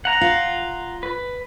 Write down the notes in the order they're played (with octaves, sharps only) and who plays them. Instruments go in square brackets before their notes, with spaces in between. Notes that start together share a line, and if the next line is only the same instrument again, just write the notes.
[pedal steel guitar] F#5 A#5
[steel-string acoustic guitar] F4
[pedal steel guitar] B4